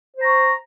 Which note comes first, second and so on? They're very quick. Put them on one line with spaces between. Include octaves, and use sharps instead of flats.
C5 A#5 C#6